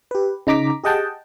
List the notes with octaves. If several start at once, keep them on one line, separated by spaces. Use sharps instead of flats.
G4 B4
C#3 D#4 A#5 D6 B6
G4 G#4 D#5 F#5 G5 A5